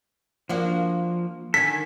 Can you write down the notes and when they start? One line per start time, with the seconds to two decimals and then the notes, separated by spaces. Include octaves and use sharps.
0.49 F3 A#3 D4 F#4
1.54 D3 D#3 A4 G#5 B6